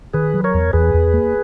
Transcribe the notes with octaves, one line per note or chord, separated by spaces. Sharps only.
D#3 G#4 B4
F#3
A#4 C#5
E2
E2 G#4 B4
E2
A#3